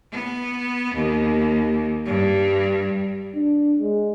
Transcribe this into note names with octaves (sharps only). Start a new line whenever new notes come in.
B3
D#2
G2
D4
G#3